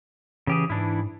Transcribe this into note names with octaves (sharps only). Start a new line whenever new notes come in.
C#3 E3 G4 G#4
G#2 E3 D4 E4